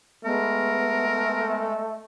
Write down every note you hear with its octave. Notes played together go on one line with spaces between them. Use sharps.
G#3 A3 B3 A#4